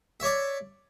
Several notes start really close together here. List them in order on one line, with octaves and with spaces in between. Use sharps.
E5 C#5 D5